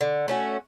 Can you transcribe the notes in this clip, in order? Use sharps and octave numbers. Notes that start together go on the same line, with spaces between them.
D3
A3 C#4 F#4